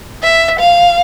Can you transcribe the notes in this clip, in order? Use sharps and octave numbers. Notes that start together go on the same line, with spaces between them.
E5
F5